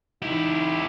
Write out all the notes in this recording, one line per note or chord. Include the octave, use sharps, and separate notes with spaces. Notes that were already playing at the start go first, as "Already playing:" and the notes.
E3 D#4 E4 G4